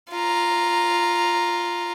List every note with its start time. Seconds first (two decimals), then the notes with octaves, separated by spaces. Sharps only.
0.11 F4 A#5